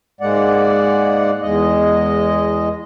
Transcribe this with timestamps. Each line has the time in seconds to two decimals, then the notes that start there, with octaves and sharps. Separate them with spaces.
0.21 G#2 G#3 A#3 D5 F#5
1.42 E2 G#3 D#5